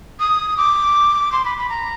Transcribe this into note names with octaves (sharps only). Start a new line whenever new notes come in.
D#6
D6
C6
B5
B5
A#5